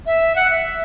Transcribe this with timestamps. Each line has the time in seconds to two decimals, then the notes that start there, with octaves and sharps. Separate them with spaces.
0.06 E5
0.36 F#5
0.50 E5